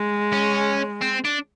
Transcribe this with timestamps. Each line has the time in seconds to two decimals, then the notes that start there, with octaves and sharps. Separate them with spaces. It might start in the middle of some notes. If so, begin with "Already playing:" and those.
Already playing: G#3
0.33 C#4
1.02 C4
1.25 D4